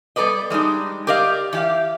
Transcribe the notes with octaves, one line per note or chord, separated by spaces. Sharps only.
G3 B3 A4 B4 D5 D#5
G3 G#3 D4 D#4
G4 A#4 D5 D#5 F5
E3 G4 F5